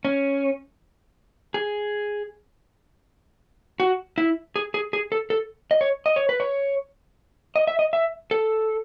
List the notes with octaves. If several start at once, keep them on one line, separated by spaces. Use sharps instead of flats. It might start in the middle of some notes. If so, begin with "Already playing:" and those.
C#4
G#4
F#4
E4
G#4
G#4
G#4
A4
A4
D#5
C#5
D#5
C#5
B4
C#5
D#5
E5
D#5
E5
A4